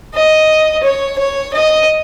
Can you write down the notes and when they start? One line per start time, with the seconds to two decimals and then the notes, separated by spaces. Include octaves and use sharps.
0.14 D#5
0.83 C#5
1.18 C#5
1.54 D#5